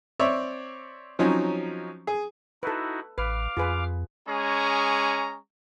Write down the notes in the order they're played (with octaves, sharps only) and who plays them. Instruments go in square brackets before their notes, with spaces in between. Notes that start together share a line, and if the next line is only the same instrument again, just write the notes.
[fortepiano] C4 C#5 D5 E5
F3 F#3 C4 C#4 D#4
G#4
[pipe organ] D#4 E4 F#4 [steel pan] A4 B4
[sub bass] A1 [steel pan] B4 [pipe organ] F5 D6 F6
[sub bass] F2 [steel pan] F4 G#4 B4
[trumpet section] G#3 C#4 G#4 A#5 C#6